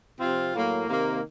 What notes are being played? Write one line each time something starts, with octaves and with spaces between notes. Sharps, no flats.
C3 F3 C4 F4
A2 F#3 A#3
C3 D#3 A#3